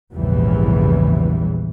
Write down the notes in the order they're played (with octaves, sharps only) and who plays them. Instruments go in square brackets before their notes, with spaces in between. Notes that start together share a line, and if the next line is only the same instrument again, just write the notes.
[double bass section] A#1 E2 G#2 C#3 E3 G3